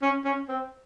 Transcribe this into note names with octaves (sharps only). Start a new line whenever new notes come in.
C#4
C#4
C4